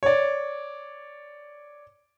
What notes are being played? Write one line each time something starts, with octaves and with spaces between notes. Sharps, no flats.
C#5 D5